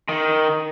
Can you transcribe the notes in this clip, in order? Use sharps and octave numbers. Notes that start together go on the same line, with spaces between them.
D#3